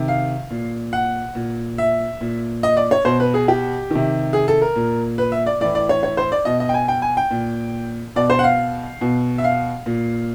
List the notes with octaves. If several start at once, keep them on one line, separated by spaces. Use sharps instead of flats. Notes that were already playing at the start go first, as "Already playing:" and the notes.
Already playing: C3 D#3
F5
A#2
F#5
A#2
E5
A#2
D#5
D5
C#5
B2 C5
B4
G#4
G4
C3 D#3
G#4
A4
A#4
A#2
B4
E5
D5
A2 E3 D5
D5
C#5
C#5
C5
D5
B2 D#5
D#5
G5
G#5
G5
G#5
G5
A#2
B2 D5
C5
F#5
F5
B2
E5
F5
A#2